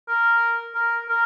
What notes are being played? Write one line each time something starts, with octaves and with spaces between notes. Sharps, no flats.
A#4
A#4
A#4